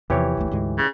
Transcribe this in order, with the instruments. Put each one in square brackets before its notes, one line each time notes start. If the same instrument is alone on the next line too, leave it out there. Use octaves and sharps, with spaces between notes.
[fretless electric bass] E2 C3 F3 [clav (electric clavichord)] E3 G4 C#5
[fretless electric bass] G1 D2 A3
D2 G#2 G#3
[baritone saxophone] C#3